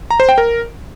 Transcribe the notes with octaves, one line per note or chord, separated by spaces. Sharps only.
A#5
C5
G5
A#4